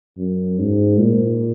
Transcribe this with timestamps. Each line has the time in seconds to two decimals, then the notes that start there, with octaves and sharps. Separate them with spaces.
0.18 F#2
0.59 G#2
0.99 A#2